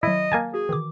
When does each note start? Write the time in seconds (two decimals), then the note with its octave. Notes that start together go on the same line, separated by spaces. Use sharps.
0.03 D#3 F#3 E4 D#5
0.32 A#3 G#5 A5
0.54 F#4 G#4
0.69 D#3 E3 D6